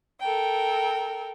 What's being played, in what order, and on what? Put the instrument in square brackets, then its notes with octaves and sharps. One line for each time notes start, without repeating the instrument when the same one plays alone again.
[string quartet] A4 A#4 G5